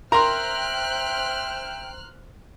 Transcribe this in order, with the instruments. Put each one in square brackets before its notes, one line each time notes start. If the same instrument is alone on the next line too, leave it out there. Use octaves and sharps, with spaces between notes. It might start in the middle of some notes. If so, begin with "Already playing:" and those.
[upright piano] A#4 C6 [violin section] C5 F6 F#6 [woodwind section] E5 G5 [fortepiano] A#5